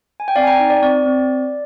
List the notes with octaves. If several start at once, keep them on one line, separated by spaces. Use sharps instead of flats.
G#5
G5
C4 D5 F5
G#5
G5 A#5
D#4
D5
C4 D5
C4